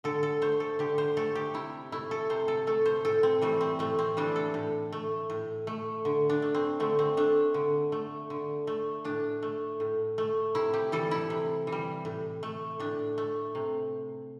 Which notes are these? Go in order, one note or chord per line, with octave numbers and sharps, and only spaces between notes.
D3 A4
A4
A3 C5
A4
D3 G4
C5
A3 A4
G4
C3 E4
A3 E4
A4
C3 C5
A4
A3 A4
C5
A2 A4
C4
E3 G3 A3
C4
A2 A3
C4
E3 G3 D4
A4
A2
A3
A2
A3
D3
D4
A3
C4
D3 A3
C4
A3 D4
D3
A3
D3
A3
A2 D4
A3
A2
A3
C3 E4
G4
E3 G3 A4
E4
C3
E3
G3
A2
A3
A2 D4
A3
C3